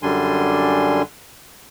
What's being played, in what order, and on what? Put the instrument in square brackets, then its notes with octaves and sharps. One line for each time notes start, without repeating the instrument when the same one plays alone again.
[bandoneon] F#2 D3 G3 D4 G#5 C6